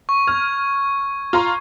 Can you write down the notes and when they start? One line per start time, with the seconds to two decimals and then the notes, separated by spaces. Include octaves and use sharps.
0.09 C#6
0.27 F6 G#6
1.33 F4 A#5 C6